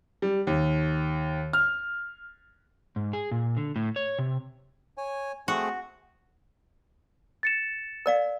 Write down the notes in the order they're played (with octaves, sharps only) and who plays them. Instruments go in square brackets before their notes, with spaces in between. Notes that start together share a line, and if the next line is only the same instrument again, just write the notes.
[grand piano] G3
D#2
F6
[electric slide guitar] G#2
G#4
A#2
D3
A2
C#5
C3
[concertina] C#5 G#5
[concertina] A3 C4 G#4 [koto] F#4
[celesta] A6 C#7 E7
[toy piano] A#4 D5 F5